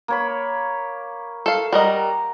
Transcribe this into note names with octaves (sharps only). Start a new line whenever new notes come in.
A#3 C#5 B5
A4 F5
G3 A#4 D#5 F#5 A#5